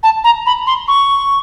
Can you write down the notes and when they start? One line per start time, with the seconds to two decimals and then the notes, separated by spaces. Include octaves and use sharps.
0.03 A5
0.24 A#5
0.46 B5
0.67 C6
0.88 C#6